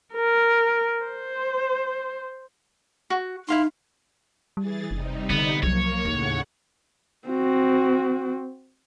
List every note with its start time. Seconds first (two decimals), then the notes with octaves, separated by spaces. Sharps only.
0.15 A#4
1.05 C5
3.10 F#4
3.48 D#4 E4 F5 C6
4.57 E3 G3 G#4 A6
4.91 F#1 C3 G3 D#4
5.30 D3 B3
5.63 C2 F3 F#3 A#3 C#5
6.05 D#2 A2 C#3 F#5
7.28 C4 F#4